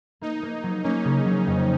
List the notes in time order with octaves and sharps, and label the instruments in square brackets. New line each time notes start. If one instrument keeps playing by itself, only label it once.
[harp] A#3 [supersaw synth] D#4
[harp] A#3
F#3
[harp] A#3 [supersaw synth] C#4
[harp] C#3
F#3
F2